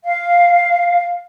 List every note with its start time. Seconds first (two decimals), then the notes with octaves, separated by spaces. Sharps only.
0.04 F5